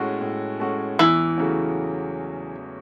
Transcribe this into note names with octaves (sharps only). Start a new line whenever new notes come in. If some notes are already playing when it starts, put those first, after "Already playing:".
Already playing: A2 G#3 C#4 F#4 A4
A2
G#3 C#4 F#4 A4
E2 E3
C#3 F#3 A3 C#4